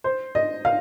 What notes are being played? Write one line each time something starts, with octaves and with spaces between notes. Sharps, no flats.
C5
D#5
F5